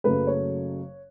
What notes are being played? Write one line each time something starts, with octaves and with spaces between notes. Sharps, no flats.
F#1 F#2 C#3 F#3 A3 B4
C#5